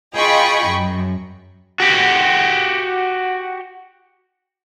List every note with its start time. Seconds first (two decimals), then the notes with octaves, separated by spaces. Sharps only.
0.15 F4 G#4 D#5 G5 B5 C#6
0.69 F#2
1.80 F#4 G4